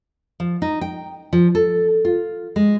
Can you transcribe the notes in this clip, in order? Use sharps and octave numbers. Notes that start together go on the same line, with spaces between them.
F3
D#4
G5
F3
A4
F4
G#3